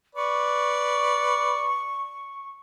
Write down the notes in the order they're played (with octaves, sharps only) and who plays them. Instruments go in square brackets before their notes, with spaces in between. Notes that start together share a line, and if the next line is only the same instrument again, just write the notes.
[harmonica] B4 D5 [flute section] C#6